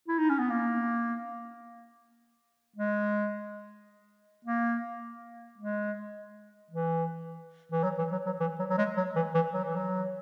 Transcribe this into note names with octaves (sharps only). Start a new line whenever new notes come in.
E4
D#4
C#4
B3
A#3
G#3
A#3
G#3
E3
E3
F#3
E3
F#3
F#3
E3
F#3
F#3
G#3
F#3
E3
E3
F#3
E3
F#3